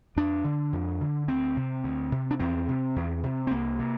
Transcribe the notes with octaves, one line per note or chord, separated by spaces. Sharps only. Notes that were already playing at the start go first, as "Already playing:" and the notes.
F2 D4
D3
F2
D3
D2 C4
C3
D2
C3
D4
E2 C4
C3
E2
C3
C4
C2 A#3
C3